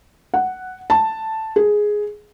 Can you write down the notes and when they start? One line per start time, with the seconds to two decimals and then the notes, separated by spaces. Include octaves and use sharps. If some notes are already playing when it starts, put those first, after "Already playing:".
0.34 F#5
0.90 A5
1.56 G#4